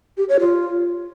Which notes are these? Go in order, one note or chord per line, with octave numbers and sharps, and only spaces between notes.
G4
C#5
F4